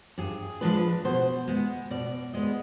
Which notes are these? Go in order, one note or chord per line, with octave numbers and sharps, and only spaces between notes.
G2 G#4
F3 G#3 D4 B4
B2 C5
G#3 B3
B2 D5
G#3 B3 D#5